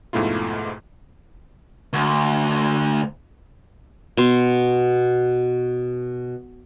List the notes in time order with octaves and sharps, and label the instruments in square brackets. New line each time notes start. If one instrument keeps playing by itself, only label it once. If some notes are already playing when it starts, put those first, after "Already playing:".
[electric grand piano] F2 G#2 B2 A3 E4 F4
[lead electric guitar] D2
[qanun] B2 C6